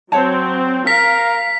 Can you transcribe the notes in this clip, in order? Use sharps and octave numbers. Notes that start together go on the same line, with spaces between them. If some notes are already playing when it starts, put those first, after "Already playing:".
F#3 C4 C#5 F#5 A5
A#4 F5 B6